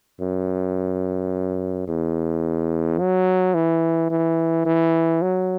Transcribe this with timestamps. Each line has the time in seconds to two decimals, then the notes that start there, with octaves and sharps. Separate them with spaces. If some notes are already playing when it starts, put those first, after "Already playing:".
0.21 F#2
1.88 E2
2.99 F#3
3.54 E3
4.10 E3
4.66 E3
5.22 F#3